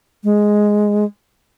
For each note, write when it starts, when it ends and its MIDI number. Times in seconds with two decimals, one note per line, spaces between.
0.24 1.04 56